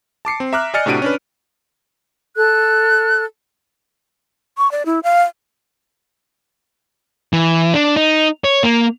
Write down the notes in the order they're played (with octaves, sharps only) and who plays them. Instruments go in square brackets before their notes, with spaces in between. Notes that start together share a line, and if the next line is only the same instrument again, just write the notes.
[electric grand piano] A5 D6 C7 C#7
C4
E5 A#5 D6 F6 F#6
D5 D#5 G#5 F6 A6 C#7
A2 C3 D4 F#4 D7 D#7
C#4 D4 B4
[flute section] A4 F#6
[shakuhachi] C#6
D5
E4
F5
[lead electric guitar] E3
D4
D#4
C#5
A#3